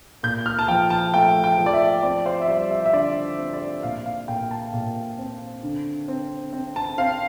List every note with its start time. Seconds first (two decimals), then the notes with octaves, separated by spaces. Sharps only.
0.23 A#2 G6
0.46 F6
0.59 A5
0.68 F3 G5
0.90 A5
1.14 A3 G5
1.44 G5
1.58 F3
1.66 D5
1.73 E5
2.03 C4 D5
2.26 C5
2.42 E5
2.48 G3 D5
2.71 E5
2.86 E5
2.93 D3 D5
3.38 C4
3.54 D5
3.83 A#2 F5
4.06 F5
4.28 A#2 G5
4.51 A5
4.73 A#2
5.18 C4
5.63 D3
6.08 C4
6.53 C4
6.76 A5
6.98 C4 F5